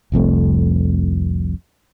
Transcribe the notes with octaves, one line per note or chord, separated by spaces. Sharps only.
F1 C2 F2 A3